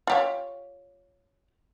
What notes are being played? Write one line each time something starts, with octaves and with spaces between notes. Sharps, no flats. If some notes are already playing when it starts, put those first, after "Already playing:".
F4 G4 C#5